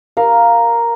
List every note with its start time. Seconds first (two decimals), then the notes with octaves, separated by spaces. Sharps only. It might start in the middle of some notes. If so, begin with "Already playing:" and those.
0.17 A#4 F5